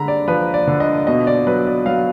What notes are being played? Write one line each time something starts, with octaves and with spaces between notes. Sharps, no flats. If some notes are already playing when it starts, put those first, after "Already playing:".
Already playing: D3 G#3 A#5 B5
D5
F3 B4
D5
D3
D#5
B2 D#5
D5
F#3 B4
D5
F#3 F5